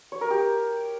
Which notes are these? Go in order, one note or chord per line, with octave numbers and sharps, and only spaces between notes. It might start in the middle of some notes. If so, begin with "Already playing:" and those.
C#5
A#4
G4